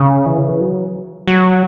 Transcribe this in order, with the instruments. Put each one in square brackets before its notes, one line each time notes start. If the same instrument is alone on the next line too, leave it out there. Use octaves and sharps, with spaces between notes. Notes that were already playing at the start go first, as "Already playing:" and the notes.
Already playing: [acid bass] C#3
E3
C#3
E3
F#3
F#3